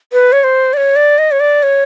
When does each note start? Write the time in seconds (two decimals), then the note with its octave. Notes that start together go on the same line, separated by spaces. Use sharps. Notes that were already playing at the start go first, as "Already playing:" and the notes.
0.13 B4
0.32 C#5
0.44 C5
0.73 D5
0.77 C#5
0.96 D5
1.18 D#5
1.32 C#5
1.40 D5
1.63 C#5